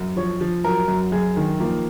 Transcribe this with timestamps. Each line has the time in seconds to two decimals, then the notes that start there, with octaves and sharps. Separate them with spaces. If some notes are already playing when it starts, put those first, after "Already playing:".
Already playing: F#2
0.16 F3 C#5
0.41 F3
0.64 F#3 A#4
0.88 F#2
1.12 F#2 G#4
1.37 D#3
1.60 F3 A#3